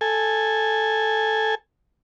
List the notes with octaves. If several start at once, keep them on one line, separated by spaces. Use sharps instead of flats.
A4 G#5